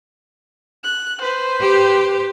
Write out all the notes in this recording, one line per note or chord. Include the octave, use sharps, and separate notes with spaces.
F#6
B4 C5
G4